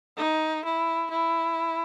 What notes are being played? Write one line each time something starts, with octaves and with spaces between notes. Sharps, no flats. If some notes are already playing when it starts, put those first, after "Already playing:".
D#4
E4
E4